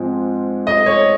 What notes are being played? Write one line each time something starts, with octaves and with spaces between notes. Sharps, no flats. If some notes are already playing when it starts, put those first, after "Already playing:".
Already playing: G#2 F3 G#3 C4
D#5
C#5